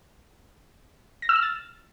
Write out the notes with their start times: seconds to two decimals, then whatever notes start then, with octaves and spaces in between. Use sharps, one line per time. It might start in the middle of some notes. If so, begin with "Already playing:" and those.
1.22 A#6
1.29 E6
1.36 F6
1.42 A6